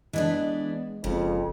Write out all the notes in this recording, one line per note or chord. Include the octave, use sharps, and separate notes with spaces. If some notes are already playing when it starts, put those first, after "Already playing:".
E3 G#3 B3 D4
F#1 F2 C#3